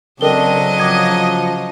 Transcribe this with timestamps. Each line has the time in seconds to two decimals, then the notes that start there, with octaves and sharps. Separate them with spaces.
0.21 C#3 F#3 C4 D4 A4 A#4 D#5 G7
0.80 F3 D6 D#6 G#6